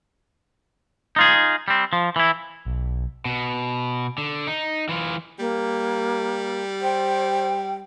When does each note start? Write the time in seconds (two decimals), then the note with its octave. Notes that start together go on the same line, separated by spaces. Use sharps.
1.16 D#4 F4 G#4
1.68 G3 C4
1.93 F3
2.16 E3 E4
2.66 B1
3.25 B2
4.18 D3
4.47 D#4
4.89 E3 F4
5.39 G3 A#3
6.81 C5 G5